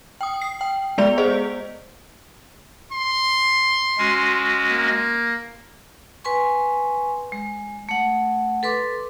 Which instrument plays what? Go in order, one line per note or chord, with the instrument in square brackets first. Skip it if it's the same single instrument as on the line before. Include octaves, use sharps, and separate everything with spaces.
[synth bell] G5 D#6
C7
G5
G#3 B3 D5 F7
G#4 C5 D#5
[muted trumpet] C6
[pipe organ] G#3 C#4 F#4
[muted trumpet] A#3
[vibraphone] B4 G#5 C6 C#6
G#3
A3 F#5
A4 B4 C6 D6